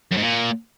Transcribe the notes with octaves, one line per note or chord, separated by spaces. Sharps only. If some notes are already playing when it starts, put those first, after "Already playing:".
F#2
G#2
A#2